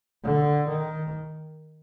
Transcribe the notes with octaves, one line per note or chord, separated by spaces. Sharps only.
D3
D#3